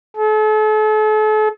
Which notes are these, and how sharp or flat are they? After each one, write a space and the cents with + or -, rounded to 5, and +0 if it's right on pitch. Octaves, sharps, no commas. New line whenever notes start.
A4 -40